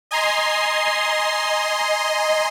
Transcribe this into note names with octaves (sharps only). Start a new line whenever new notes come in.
D#5 G#5 A#5 C6 C7